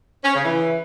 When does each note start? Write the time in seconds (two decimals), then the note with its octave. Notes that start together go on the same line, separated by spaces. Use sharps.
0.24 C#4
0.34 C#3
0.44 E3